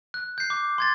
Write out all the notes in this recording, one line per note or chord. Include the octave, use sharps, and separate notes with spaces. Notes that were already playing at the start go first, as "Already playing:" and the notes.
F#6
G6 C7
D6
C6 G#6 A6